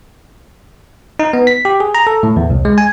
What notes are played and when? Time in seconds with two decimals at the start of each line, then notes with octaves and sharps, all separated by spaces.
1.19 D#4
1.33 B3
1.47 B6
1.65 G4
1.80 G#4
1.95 A#5
2.07 A4
2.23 A2
2.37 E2
2.50 C2
2.65 G#3
2.78 G#5